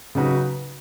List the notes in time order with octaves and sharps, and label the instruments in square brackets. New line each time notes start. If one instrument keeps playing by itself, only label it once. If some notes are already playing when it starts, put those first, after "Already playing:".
[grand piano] C#3 F#3 D#4 F#4 B4